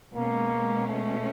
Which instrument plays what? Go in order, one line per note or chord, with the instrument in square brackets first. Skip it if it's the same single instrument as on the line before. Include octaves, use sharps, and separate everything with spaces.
[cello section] B2 G#3 C#4 [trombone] A#3
[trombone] A3